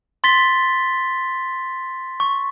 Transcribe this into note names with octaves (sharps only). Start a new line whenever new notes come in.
C6 A6 B6 G7
C#6